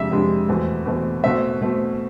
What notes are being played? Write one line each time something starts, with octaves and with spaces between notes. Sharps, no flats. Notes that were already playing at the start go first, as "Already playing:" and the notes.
Already playing: F2 C3 G#3 D4 E5
F2 C3 G#3 D4
E2 B2 A3 C4
E2 B2 A3 C4
B2 A3 C4 E5
B2 A3 C4